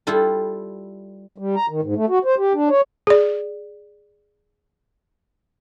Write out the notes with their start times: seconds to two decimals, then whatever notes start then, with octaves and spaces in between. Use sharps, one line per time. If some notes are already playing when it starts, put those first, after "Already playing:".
0.07 G3 E4 F4 A4
1.38 G3
1.56 A#5
1.69 D#3
1.82 G#2
1.96 A3
2.09 F#4
2.25 C5
2.38 G4
2.54 D4
2.69 C#5
3.07 G#4 D5